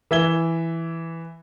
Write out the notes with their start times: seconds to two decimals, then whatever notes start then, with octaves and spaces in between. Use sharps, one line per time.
0.11 E3 E5 G#6 G7